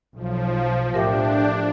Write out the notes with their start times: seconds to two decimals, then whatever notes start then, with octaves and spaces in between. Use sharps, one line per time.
0.16 B1 B2 F3
0.94 A2 D4 G4 A#4 E5 G5